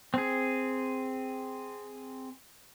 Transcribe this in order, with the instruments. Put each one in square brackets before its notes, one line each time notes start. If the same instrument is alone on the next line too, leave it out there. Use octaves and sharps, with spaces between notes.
[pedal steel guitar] C4 G#4